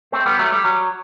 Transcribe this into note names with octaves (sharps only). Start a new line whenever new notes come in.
A3 C4
G3 B3
F#3 A3
G3
F#3